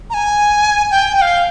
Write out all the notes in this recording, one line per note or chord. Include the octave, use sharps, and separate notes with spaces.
A#5
G#5
G5
G5
F5